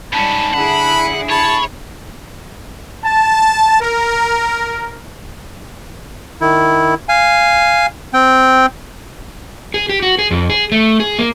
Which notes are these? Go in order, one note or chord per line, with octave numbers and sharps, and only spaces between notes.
G#2 G3 C#4 D#4 A5 B5
D3 E4 G#4 F#5 B5
C#5 A5 B5
A5
A#4
D#3 E4
F5 G#5
C4 G5
G#4
G4
F#4
G#4
F2
G#4
A3
G#4
A#3